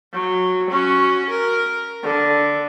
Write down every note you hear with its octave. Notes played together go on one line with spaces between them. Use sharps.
F#3
C#4 F#4
A#4
D3